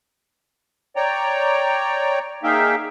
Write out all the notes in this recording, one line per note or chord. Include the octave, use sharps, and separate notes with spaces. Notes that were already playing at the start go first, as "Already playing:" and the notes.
C#5 D5 G5 A#5
A#3 D#4 G#4 E5 F5 G5